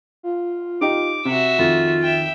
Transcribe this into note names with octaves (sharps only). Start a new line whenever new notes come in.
F4
D#4 G4 D#5 D6
C3 F#4 E5
F2 D#3 F4
E5 G5